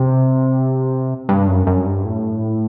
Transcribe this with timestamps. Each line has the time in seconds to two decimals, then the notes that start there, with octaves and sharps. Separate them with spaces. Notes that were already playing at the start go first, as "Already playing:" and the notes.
Already playing: C3
1.29 G2
1.48 F#2
1.67 F#2
1.86 G2
2.05 A2